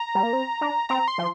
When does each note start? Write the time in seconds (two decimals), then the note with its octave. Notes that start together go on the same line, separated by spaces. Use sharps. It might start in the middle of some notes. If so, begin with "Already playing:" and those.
Already playing: A#5
0.15 G3
0.23 A#3
0.33 C4
0.61 D4
0.89 C4 A#5
1.08 C6
1.18 F3